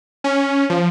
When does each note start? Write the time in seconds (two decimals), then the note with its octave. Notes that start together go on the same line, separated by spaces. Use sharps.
0.24 C#4
0.70 F3